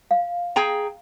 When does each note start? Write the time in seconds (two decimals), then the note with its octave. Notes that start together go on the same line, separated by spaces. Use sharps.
0.11 F5
0.56 G#4 G5 A#5